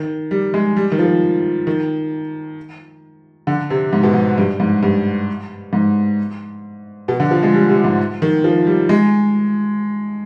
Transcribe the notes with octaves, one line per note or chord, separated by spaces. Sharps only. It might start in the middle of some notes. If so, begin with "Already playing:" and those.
Already playing: D#3
G3
G#3
G3
D#3
F3
D#3
D3
C3
G#2
B2
G#2
G2
G#2
G2
G#2
B2
D3
F3
G#3
G3
C3
G#2
D#3
F3
G3
G#3